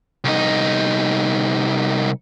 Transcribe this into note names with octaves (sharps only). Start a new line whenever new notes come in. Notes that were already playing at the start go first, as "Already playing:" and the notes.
C2 D#4